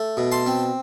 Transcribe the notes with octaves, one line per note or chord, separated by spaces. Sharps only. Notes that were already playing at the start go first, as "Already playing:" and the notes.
Already playing: A3
B2
A5 C6
C4